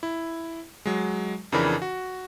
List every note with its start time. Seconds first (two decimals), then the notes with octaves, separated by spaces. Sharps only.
0.03 E4
0.86 F#3 G#3
1.52 F2 C#3 E3 D4 A#4 B5
1.82 F#4